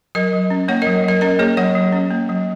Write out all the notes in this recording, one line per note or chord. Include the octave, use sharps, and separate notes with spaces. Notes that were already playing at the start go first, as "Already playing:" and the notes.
F#3 A#4 D#5
F#3
C#4
A#3 C#5 F#5
F#3 A#4 D#5
F#3 A#4 D#5
C#4 A#4 D#5
A#3 G#4 C#5
F#3 C#5 F#5
F#3
C#4
A#3
F#3